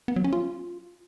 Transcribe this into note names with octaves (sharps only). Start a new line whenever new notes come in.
B3
F#3
C#4
F4